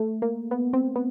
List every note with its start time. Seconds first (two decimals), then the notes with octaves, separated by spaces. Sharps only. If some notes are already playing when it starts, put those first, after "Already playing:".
Already playing: A3
0.22 A#3
0.51 B3
0.73 C4
0.96 B3